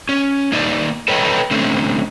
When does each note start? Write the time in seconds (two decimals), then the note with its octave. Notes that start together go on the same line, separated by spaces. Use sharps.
0.09 C#4
0.52 A#3 D#4 D5
1.08 A4 B4 C#5 D#5 G5
1.51 D3 A3 C4 C#4